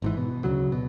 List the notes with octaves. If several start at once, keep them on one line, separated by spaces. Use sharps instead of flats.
G#1 G#2 E3
B2
D2 C#3 F#3
B2